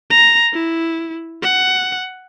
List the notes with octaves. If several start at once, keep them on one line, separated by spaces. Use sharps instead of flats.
A#5
E4
F#5